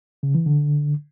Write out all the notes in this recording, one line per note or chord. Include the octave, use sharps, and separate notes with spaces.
C#3
E3
D3